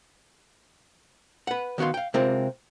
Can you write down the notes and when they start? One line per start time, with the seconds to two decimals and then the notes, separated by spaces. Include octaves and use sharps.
1.47 B4 F#5
1.78 D#3 B3 F#4 F5 C6
1.94 F5 G5
2.14 C3 G#3 C4 F4 A#4